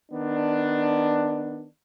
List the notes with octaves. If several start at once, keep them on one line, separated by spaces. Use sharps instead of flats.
D#3 B3 D4